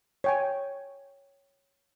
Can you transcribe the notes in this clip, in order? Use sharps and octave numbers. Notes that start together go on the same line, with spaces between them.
C#5 G5 G#5